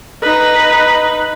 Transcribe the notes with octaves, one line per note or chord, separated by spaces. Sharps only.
D#4 B4